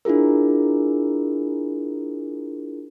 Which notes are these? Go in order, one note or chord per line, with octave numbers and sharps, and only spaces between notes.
D4 E4 F4 G#4 A#4